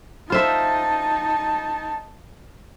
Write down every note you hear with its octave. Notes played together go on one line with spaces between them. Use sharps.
D#4 F4 C5 E5 A5